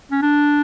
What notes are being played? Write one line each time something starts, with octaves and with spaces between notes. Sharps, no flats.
C#4
D4